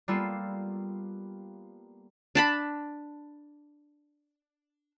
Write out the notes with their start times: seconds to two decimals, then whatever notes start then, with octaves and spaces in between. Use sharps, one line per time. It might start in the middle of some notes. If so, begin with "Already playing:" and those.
0.08 G3 A#3 B3 F4 A4
2.35 D4 A5 B5